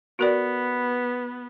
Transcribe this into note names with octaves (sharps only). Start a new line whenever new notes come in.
B3 F#4 A#4 D5